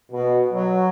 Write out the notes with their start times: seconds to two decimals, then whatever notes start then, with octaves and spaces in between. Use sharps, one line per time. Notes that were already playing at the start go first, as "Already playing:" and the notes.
0.12 B2
0.53 F#3